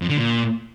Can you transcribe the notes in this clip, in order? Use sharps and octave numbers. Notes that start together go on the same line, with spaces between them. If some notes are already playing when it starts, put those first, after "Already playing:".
F2
D3
A#2